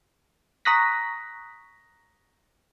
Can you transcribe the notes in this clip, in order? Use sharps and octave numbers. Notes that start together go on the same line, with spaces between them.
A#5 C#6 D#6 F#6 A#6 B6